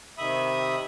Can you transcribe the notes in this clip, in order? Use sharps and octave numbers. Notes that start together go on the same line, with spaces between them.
C3 D#3 E5 B5 D#6